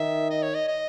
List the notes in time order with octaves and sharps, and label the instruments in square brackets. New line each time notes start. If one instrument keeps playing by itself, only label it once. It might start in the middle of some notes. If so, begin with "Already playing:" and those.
Already playing: [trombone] D#3 [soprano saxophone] E5
[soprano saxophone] D#5
C#5
D#5
D#5